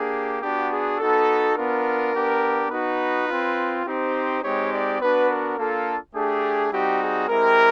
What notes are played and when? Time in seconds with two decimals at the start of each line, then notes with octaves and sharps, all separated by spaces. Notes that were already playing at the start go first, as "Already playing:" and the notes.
Already playing: A#3 D4 G4 G#4
0.41 B3 D4 F#4 G4
0.70 G#4
0.98 B3 D#4 F#4 A4
1.55 B3 D4 F4 A#4
2.13 B3 D4 G4
2.70 B3 D#4 F#4 B4
3.27 F4
3.32 C4
3.85 C4 D#4 G4 C5
4.42 G#3 C4 D#4 G4 C#5
4.72 D5
4.99 B3 D4 F#4 B4
5.29 A#4
5.56 A#3 D4 F4 A4
6.14 A3 D4 G4 G#4
6.71 G3 C4 D#4 F#4 G4
7.00 G#4
7.28 G#3 C4 E4 G4 A#4